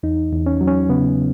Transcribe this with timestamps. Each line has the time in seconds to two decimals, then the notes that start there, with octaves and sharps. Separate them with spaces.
0.03 E2 D#4
0.32 E2
0.46 C#4
0.61 F#3
0.67 C#4
0.89 C#3 B3